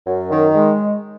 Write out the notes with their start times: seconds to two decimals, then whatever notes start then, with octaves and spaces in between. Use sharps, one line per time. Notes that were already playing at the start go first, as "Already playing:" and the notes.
0.06 F#2
0.30 D#3
0.55 G#3